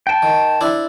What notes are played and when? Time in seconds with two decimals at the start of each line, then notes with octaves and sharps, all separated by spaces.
0.07 G5 A5
0.22 D#3
0.61 D4 E4 C5